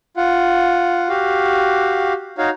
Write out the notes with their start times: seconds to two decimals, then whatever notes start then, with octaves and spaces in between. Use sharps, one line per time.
0.17 F4 F#5
1.09 F#4 G4 F5
2.38 D#4 F#4 C#5 F5